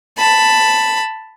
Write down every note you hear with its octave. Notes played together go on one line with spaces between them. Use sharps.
A5 B5